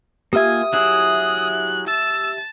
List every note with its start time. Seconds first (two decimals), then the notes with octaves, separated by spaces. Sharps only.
0.33 A#3 F4 G4 E5 G#5 D#6
0.73 F#3 E4 G#4 F#6
1.88 A5 E6